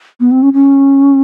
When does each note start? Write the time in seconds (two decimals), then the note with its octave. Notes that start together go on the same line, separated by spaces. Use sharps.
0.20 B3
0.31 C4
0.42 C#4
0.53 C#4